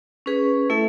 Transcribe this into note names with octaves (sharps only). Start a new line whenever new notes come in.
C#4 G#4 B4
A3 E4 A4 E5